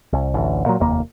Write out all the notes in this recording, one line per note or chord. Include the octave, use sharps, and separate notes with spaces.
C2
A1 D2
A#2 F#3
F1 D#2 A#3